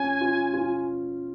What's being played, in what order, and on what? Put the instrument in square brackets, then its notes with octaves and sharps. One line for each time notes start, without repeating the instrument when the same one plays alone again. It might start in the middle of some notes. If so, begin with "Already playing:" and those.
Already playing: [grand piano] C#4 F4 [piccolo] G#5
[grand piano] F4
F4